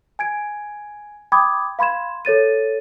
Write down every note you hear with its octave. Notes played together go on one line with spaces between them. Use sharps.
G#5 G#6 D7
G5 B5 D6 D#6 G#6
F5 B5 C6 G#6 E7
A4 C#5 A6 D#7